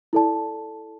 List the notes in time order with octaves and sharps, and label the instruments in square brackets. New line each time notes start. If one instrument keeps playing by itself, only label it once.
[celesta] E4 A4 D5 A5